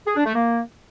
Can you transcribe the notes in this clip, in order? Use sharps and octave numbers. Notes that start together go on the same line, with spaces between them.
G#4
D4
A3
A#3